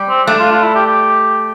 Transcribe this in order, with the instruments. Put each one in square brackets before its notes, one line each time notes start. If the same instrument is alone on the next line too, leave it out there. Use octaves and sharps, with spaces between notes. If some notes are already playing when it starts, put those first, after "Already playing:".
Already playing: [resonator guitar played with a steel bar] G3
[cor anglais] C4
[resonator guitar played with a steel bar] A3 [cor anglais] D4
[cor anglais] F4
F4
E4
G4
G4